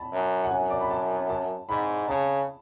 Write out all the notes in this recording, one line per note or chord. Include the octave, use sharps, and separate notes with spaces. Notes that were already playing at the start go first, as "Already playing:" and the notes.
Already playing: A5 B5
F#2
F#5
F#2 G#5
D5
B5
A5
A5
G#2 B5
C#3 A5